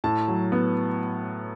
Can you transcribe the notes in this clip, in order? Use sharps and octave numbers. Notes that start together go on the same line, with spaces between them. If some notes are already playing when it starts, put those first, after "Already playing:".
A2 A5
F#3
B3